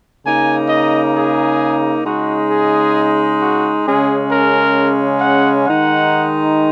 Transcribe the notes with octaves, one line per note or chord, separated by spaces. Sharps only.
C#3 A#3 D#4 G#5
D#5
G#4
C#3 G#3 D#4 F#4
G#4
F#4
C#3 G#3 C#4 G#4
A#4
F#5
D#3 G#3 D#4 F#5